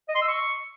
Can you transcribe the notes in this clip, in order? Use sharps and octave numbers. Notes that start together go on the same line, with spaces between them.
D#5
C6
E6
C#6